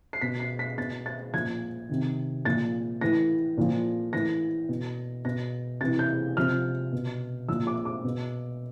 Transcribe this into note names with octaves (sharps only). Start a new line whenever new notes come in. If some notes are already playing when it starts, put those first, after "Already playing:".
C7
B2 B6
C7
B6
B2 A6
A6
A#2 F3 G#6
C3 D#3
A#2 F3 A6
A2 E3 A#6
A#2 F3
A2 E3 A#6
B2
B2 A#6
C3 E3 A6
G6
C3 F3 F6
B2
A#2 F3 E6
D6
D6
B2